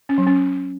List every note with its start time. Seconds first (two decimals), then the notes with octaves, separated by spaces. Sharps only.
0.09 C#4
0.18 F#3
0.27 C#4